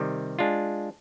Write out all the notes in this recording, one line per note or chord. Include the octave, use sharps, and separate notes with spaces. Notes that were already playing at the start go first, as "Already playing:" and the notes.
Already playing: C3 D#3 G3
G#3 D4 F4